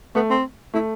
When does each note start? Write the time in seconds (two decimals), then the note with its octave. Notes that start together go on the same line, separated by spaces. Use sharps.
0.15 A3 B3
0.30 C4
0.74 A3 E4